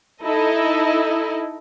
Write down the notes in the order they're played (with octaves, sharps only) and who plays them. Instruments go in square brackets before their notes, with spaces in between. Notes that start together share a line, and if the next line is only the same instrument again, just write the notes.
[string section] D#4 E4 A4 D#5